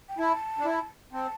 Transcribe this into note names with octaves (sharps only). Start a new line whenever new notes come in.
G5
E4 A5
D4
E4
C4 A5